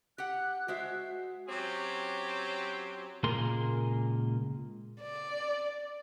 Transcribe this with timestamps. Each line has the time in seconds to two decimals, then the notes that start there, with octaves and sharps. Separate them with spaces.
0.18 G4 F#5 F#6
0.68 G#3 F#4 C5 E5
1.48 F#3 C4 C#4 G4
3.23 C#2 A#2 A#3 G#4 A#4 C6
5.01 D5